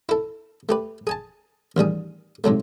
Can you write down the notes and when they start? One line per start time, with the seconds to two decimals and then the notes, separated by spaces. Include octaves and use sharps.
0.09 E4 A4
0.69 A3 G4 B4
1.07 G#4 G#5 A5
1.77 A1 D#2 G3 G#4
2.44 G#2 C3 F#3 A3